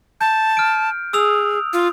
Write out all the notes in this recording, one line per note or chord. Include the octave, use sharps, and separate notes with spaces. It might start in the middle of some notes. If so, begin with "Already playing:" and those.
A5 G6
F6 D7
G#4 D#6 E6 F7
F4